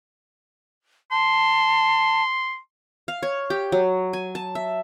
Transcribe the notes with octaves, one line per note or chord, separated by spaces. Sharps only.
A5 C6
F5
C#5
G4
F#3
G#5
A5
E5